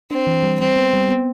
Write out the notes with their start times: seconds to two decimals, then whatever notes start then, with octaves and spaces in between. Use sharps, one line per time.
0.11 C4 D4
0.27 E3
0.43 G3
0.59 G3 C4
0.76 B3
0.93 G3
1.09 B3